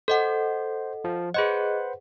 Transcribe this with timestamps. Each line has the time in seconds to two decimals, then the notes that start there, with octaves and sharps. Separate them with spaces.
0.08 A4 C5 D#5 F#5
1.04 F3
1.34 G#4 B4 C5 D#5 F#5